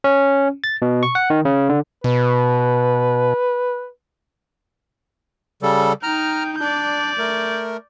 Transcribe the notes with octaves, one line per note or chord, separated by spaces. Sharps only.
C#4
A6
B2
C#6
F#5
D#3
C#3
D3
B2 B4
C#3 G3 A4
D#4 G5 A#5 F6
D4 D5 G6
A3 A#4